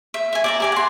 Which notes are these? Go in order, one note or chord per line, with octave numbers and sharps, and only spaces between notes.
E5
E5 G#5
D5 E5 A#5
G4 G#5 D6
F#5 C6